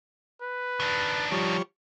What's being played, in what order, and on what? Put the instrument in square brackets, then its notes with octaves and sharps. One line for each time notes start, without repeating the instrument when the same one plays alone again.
[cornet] B4
[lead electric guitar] D#3 D4
[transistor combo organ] F3 G3 C#5